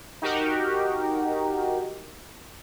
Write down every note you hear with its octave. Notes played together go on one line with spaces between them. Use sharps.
D#4 F#4 G4 A#4